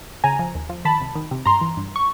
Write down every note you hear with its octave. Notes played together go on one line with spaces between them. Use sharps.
C#3 G#5 A#5
F3
D#2
F3
D#3 A5 B5
C2
D#3
C3
G2 A#5 C6
E3
G2
C#6